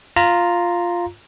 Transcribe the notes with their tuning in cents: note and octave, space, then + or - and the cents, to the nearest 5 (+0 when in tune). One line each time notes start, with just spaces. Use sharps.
F4 +0 A#5 +0